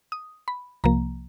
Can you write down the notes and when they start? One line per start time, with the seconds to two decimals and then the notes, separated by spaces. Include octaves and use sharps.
0.12 D#6
0.48 B5
0.84 C2 C3 F3 A#3 A#5